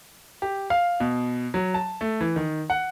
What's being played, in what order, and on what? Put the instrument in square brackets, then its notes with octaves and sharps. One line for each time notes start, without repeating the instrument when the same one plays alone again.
[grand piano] G4
F5
B2
F#3
A5
A3
E3
D#3
F#5